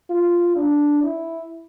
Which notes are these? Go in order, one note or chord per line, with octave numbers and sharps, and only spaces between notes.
F4
D4
E4